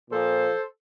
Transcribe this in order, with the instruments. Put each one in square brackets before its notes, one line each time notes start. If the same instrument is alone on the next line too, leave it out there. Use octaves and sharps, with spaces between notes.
[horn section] A#2 F3 A4 C5